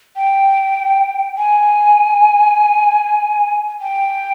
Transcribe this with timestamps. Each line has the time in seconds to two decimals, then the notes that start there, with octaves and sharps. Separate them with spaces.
0.16 G5
1.38 G#5
3.81 G5